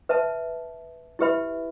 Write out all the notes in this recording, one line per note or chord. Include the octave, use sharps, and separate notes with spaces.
B4 E5 A5
E4 G4 B4 E5 B5